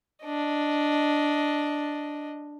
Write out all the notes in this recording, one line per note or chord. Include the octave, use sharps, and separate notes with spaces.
D4 D#5